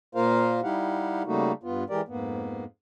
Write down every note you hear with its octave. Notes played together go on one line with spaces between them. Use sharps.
A#2 A#3 F4 A#4 C5 F5
G3 D#4 E4 G4 F5 F#5
C#3 G3 A3 A#3 D#4 F#4
G2 B3 F4
E3 G#3 G4 A#4 D5
F2 G#2 A#3 B3